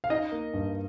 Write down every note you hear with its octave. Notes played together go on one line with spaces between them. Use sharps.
F5
D#4 D#5
A#3
G2